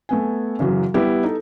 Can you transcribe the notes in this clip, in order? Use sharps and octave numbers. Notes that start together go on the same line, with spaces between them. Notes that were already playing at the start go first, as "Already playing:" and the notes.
A3 B3 G#5
F#2 C#3 E3 F#3
G3 B3 E4 G4
D#4 A4